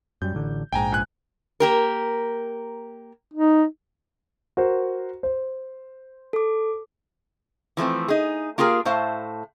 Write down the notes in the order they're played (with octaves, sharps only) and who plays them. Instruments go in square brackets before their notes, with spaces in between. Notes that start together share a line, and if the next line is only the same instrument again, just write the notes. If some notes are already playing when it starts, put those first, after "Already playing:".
[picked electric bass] F#2 G3 [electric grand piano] G6
[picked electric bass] A1 D3
[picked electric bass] A#1 G#2 [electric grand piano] G5 G#5 A#5
[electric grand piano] C#2 G#5 F#6
[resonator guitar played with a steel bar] A#3 G4 A#4
[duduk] D#4
[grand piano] F#4 A#4 C5
C5
[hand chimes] A4 D6
[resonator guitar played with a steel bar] E3 F3 A3 C4
D#4 G#4
A#3 F4 G4 G#4 A#4
A2 A3 C5 F5 A5